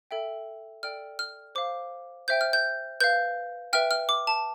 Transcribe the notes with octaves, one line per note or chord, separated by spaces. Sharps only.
A4 E5 G5
A4 D5 G5 F6
F6
C5 F5 D6
C5 E5 G5 G6
F6
G6
B4 F5 G6
B4 E5 G5 F6
F6
D6
A5